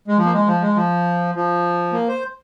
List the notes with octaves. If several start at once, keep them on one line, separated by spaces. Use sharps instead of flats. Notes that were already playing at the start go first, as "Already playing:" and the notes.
G#3
F3
A#3
G#3
F3
G#3
F3
F3
A#3
C5